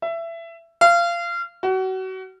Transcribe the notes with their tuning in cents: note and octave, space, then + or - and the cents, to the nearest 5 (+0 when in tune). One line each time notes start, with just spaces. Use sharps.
E5 +20
F5 -25
F#4 +30